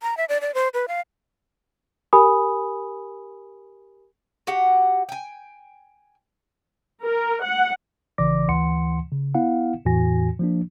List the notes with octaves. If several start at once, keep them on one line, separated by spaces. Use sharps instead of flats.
A#5
E5
D5
D5
C5
B4
F5
G4 A#4 G#5 B5 D#6
F#4 G4 F#5
G5 G#5
A#4
F#5
A#1 C#3 E3 D5 D6 A#6
D2 E3 F#5 C6 C#7
C#3
B3 E4 F5 F#5
E2 A2 E3 F#4 G#5 A#6
F3 A#3 D4